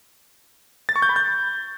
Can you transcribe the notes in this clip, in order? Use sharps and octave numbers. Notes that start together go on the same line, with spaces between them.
A6
C#6
G6
B5
G6